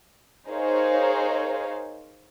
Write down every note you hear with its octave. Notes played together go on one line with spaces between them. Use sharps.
D#4 G#4 A#4 C5 C#5 F5